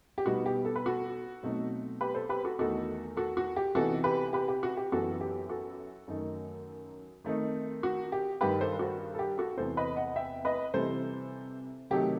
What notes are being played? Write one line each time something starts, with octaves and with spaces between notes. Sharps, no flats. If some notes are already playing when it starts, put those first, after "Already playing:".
G4
B2 G3 B3 D#4 F#4
G4
A4
B4
F#4 A4
B2 F#3 A3 C4 D#4
G4 B4
A4 C5
G4 B4
F#4 A4
E2 D#3 A3 D#4 F#4 A4
F#4 A4
F#4
G4
C3 E3 B3 D#4 F#4 A4
G4 B4
G4 B4
G4
F#4
G4
F#2 E3 B3 F#4 A4
G4
F#4 A4
F#2 D#3 A3 D#4
D#3 A3 C4 D#4
F#4
G4
G2 D#3 G3 D#4 G4 B4
A4 C5
F#4 A4
A4
G4
F#4 A4
E2 C3 E3 B3 A4 C5
B4 D#5
D#5 F#5
E5 G5
B4 D#5
C3 E3 G3 A4 C5
C3 D#3 F#3 A3 D#4 G4